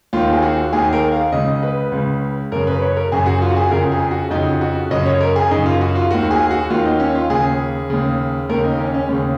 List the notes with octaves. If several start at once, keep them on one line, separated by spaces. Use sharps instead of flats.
D#2 D#3 F4
G#4
F#4
D#2 D#3 G#4
A#4
F5
C#2 C#3 D#5
B4
C#2 C#3
F#2 C#3 A#4
B4
C#5
A#4
F#2 C#3 G#4
F#4
F4
F#4
G#4
F2 C#3 A#4
G#4
F#4
F2 C#3 D#4
F#4
F#2 C#3 D#5
C#5
A#4
G#4
F#2 C#3 D#4
F4
F#4
F4
D#2 D#3 F#4
G#4
F#4
D#2 D#3 F4
D#4
C#4
F4
D#2 C#3 G#4
D#2 C#3
D#2 C#3 A#4
D#4
C#4
C#4
D#2 C#3